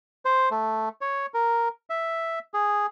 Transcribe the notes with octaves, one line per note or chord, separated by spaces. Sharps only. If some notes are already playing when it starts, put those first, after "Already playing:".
C5
A3
C#5
A#4
E5
G#4